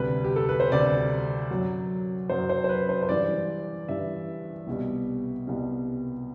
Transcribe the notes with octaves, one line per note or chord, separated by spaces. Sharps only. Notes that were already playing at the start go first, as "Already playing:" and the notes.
Already playing: D2 C3 G3 B4
G4
A4
B4
C5
D2 C3 G3 D5
F#2 F#3
F#2 F#3 C5
C5
C5
B4
C5
C5
G2 E3 G3 D5
G2 E3 G3 E5
C2 B2 G3
C2 B2 G3